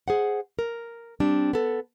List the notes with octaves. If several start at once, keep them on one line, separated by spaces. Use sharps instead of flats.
G#4 C5 F#5
A#4
G3 C4 D4
B3 A4